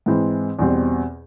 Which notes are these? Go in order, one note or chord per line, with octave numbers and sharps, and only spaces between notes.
G#2 E3 G#3 C4 E4
E2 B2 G3 C4